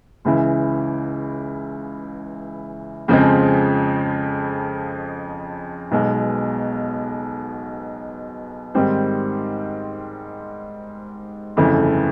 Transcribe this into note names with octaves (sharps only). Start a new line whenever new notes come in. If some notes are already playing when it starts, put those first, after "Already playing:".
C#2 C#3 E3
F2 C#3 F3 G#3 C4
B1 B2 G#3
G#2 D#3 G3 C4
G1 F2 C#3 E3 A3